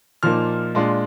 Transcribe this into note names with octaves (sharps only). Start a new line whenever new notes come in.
A#2 F3 A#3 D#4 F6
A#2 G#3 D4 F4